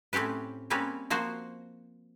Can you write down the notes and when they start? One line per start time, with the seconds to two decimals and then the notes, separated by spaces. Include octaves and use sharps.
0.13 A2 C4 C#4 G4 B4
0.70 G3 A#3 C4 C#4 B4
1.10 F3 A#3 F#4 C5